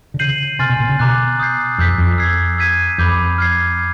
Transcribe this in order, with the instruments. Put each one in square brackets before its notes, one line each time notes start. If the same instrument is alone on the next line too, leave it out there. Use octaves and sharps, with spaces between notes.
[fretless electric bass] D3
[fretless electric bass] C#3 [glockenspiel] G6 C7 D#7 F#7
[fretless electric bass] C3 [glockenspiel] G#5 C6 F6 A6
[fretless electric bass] B2
A#2
C#3
[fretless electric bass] B2 [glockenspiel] A#5 D6 F#6
[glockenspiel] D#6 G6 C7
[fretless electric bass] F2 [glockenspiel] E6 G6 B6
[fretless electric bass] F2
[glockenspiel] E6 G#6 C7
E6 G#6 B6 D#7
[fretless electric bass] F2 [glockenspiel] B5 D6 G6
[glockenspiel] F6 G#6 C7